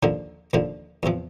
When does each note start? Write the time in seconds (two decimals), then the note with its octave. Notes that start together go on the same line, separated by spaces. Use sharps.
0.03 D#2 D3 F3
0.53 D#2 D3 F3
1.03 E2 C3 F3